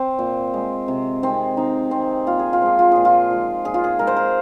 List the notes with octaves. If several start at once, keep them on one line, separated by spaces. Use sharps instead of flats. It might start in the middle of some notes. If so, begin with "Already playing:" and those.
Already playing: C4
A#2
G#3
C3
D#3 G#3 C4
C3 D#4
D#3 G#3 C4
A#2 F4
G#4
F4
F3 G#3 G#4
F4
A#2 G#4
F4
F3 G#3
A#2 G#4
F4
G#4
G#3 A#4
C5
A#4